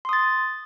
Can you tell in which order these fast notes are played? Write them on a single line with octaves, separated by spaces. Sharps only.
C6 D#6 A6